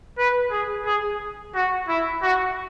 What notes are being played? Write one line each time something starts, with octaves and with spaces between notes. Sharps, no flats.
B4
G#4
G#4
F#4
E4
F#4